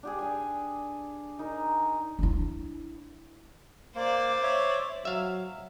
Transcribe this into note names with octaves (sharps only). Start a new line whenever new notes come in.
D4 G4 G#4
G#5
D#4 A#4
D4 E4
A#3 C5 D5
C#5 E5
F#3 E5 F5